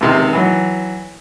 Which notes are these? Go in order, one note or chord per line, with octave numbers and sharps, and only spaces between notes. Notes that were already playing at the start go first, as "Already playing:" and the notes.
C#2 C3 D#3
E3 F#3